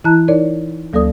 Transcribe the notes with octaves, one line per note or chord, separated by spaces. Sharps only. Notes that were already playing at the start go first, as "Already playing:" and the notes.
E3 E4 A5 A#5 F#6
D#4 A#4 C#5 D5
D2 F#3 A#3 A4 D5 D#6